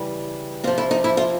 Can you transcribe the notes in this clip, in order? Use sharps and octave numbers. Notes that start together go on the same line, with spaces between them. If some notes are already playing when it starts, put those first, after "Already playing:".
Already playing: C#3 E3 G3
C3 F3 F4
E4
D#4
E4
F4